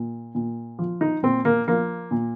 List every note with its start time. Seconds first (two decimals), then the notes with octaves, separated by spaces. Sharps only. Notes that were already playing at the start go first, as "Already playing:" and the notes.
Already playing: A#2
0.35 A#2
0.79 F3
1.01 D#4
1.23 A#2 C4
1.45 A#3
1.68 F3 A#3
2.11 A#2